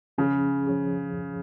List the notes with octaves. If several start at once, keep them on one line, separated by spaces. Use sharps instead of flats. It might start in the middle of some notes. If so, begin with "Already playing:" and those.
C#3 F3 C#4 G#4
F3 C#4 G#4